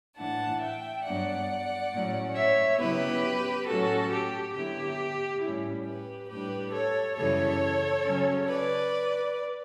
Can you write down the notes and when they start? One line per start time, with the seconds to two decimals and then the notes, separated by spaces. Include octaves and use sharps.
0.17 A2 E3 A3 D4 F#5 A5
0.61 E5 G5
1.04 G2 F#3 B3 D4 D5 F#5
1.92 A2 F#3 C#4
2.35 C#5 E5
2.79 C#3 F#3 B3 E4 G4 B4
3.66 A2 F#3 A3 C#4 F#4 A4
4.10 G4
4.53 D3 F#3 B3 E4 G4
5.42 A2 G3 C#4 E4
5.85 G4 B4
6.28 A2 G3 D4 G4 B4
6.72 A4 C#5
7.16 F#2 C#3 E3 G3 A4 C#5
8.03 C#3 F#3 C#4
8.48 B4 D5